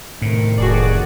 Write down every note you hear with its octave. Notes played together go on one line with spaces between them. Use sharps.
A2 C3 D#3
F1 F#4 G#4 D5